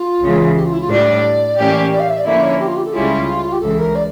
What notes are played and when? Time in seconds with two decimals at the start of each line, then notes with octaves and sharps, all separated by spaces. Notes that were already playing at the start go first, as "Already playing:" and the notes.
Already playing: F4
0.22 C#2 C#3 E3
0.56 G4
0.64 F4
0.73 E4
0.81 F4
0.90 A2 G3 D4 D5
1.58 A2 E3 A#3 C#4 G4
1.91 D5
2.00 F5
2.09 E5
2.17 D5
2.25 D3 F3 A#3 C#4 E4 E5
2.43 C#5
2.59 G4
2.67 F4
2.76 G4
2.85 A4
2.93 C#2 C#3 G3 C#4 E4 F4
3.52 G4
3.61 C#2 C#3 E3 A4
3.79 A#4
3.95 D5